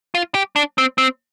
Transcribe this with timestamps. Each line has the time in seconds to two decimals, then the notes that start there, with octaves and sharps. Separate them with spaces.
0.15 F4
0.35 G4
0.56 D4
0.78 C4
0.98 C4